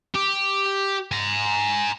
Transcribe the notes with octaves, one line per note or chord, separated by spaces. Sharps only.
G4
G#5 A#5